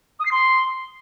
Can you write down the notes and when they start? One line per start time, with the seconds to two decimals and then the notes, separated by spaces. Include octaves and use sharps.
0.19 D#6
0.25 C7
0.31 C6